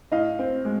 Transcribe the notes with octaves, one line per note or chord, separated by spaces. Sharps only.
A2 D#5 F5
C4
G#3